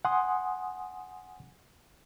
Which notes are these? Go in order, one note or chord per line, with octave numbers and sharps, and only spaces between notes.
F#5 G#5 C6 D#6